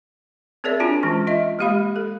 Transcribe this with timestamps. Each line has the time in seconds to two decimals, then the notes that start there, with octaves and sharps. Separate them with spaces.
0.64 C4 G#4 A#4 C#5 D5 E5
0.80 D4 F4 F#4 G#5 A5
1.03 E3 G#3 C#4 F4
1.27 F4 D#5 E5
1.59 G#3 A#3 G4 F5 B5
1.96 A4